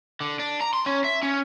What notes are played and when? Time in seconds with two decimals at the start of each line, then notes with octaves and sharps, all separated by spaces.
0.21 D3
0.39 D4
0.61 A#5
0.73 C6
0.86 C#4
1.04 E5
1.23 C#4